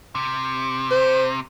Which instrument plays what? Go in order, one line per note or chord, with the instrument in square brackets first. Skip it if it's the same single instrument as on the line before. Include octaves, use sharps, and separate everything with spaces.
[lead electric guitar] C3
[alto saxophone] C5